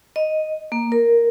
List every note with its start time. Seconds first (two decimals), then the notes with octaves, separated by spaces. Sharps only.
0.16 D#5
0.72 A#3
0.92 A#4